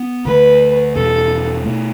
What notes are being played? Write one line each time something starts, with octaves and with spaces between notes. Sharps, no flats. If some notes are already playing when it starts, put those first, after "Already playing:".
Already playing: B3
D2 D3 A3 B4
E2 B2 G3 A4
B2 A3